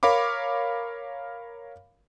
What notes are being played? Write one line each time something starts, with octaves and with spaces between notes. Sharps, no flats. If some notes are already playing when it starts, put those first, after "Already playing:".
A#4 C#5 F5 B5 D6